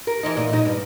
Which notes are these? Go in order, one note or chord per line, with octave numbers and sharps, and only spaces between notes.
A#4
E3 F3 D#4
A#2 D#5
F#2 D#4 D#5
G2